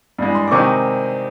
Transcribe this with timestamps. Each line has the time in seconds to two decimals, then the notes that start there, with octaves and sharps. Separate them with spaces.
0.19 G2 E3 G#3
0.35 C6
0.48 D6
0.51 C3 D#3 G#3 C4 D#4 C#6